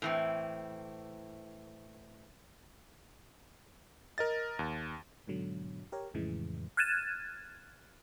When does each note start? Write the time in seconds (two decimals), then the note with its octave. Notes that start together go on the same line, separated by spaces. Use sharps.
0.02 A2 E3 C4
4.18 A#4 D#5 A6
4.59 D#2
5.27 G#2 B2 D3 F#3
5.92 G4 A#4 C#5
6.14 F2 A2 C#3 E3 G#3
6.77 F6 F#6 G#6 A6 D#7 E7